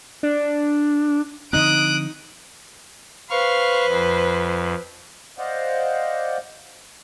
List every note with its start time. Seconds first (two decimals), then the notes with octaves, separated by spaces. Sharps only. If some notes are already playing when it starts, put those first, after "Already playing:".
0.23 D4
1.53 D3 F3 C4 D#4 D#6 F#6 D7
3.30 B4 C5 F5 C#6 F6
3.86 F2
5.39 C5 D5 D#5 F5 F#5